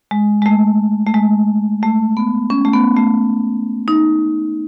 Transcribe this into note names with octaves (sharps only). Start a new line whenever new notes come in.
G#3
G#3
A3
A3
G#3
A3
B3
C#4
A3
B3
A3
D#4